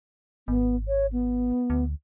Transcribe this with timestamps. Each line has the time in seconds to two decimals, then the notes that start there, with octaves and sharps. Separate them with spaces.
0.48 G#1 B3
0.88 C#5
1.13 B3
1.70 D2